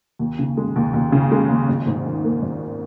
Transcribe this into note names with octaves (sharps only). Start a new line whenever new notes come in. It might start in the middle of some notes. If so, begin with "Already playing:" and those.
D#2
C#3
G#3
D#2
D#2
C#3
G#3
D#2
G#1
G#2
D#3
A#3
G#1